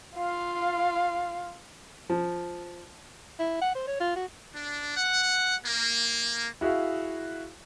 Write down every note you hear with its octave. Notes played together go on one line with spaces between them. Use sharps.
F4 F5
F3
E4
F#5
C5
C#5
F4
F#4
D4
F#5
A#3
E4 F#4 G#4 E5 F5